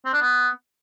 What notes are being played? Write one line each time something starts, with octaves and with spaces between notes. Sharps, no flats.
C4
D4
B3